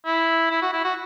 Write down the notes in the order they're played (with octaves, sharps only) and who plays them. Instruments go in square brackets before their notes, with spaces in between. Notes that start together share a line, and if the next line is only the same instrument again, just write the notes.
[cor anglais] E4
E4
F#4
E4
F#4